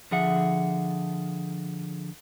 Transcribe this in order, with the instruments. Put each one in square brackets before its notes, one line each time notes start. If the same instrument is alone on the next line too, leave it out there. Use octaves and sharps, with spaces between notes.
[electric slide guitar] D3 F3 G#4 E5 F#5